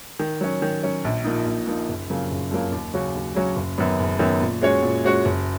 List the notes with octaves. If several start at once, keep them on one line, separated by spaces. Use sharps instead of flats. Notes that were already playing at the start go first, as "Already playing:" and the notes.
D#3
F#3 C#4
D#3
F#3 C#4
A#1
A#2 F3 A#3 D#4
A#1
A#2 F3 A#3 D#4
F#1
F2 C#3 F#3 A#3
F#1
F2 C#3 F#3 A#3
D#2
C#3 F#3 C#4 F#4
D#2
C#3 F#3 C#4 F#4
F#1
F#2 D#3 F#3 B3
F#1
F#2 D#3 F#3 B3
A#2
G#3 C#4 F#4 C#5
A#2
G#3 C#4 F#4 C#5
F#1